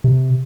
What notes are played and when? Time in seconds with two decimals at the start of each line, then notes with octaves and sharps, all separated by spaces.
0.04 C3